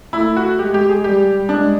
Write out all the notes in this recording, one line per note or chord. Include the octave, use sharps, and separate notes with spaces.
A3 E4
F#4
G#3 G4
G4
G#4
G3 G4
G#3 D4